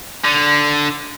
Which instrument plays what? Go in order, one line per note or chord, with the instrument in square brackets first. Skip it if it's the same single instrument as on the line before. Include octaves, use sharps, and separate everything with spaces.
[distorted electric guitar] D3